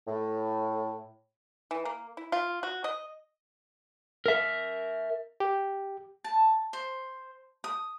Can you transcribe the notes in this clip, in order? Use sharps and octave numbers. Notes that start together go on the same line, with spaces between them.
A2
E3
A#3
E4
F4
F#4
D#5
A#4 E5
G4
A5
C5
D#6